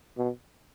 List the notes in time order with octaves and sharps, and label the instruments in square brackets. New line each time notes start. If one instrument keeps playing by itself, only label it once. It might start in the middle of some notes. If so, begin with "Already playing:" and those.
[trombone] B2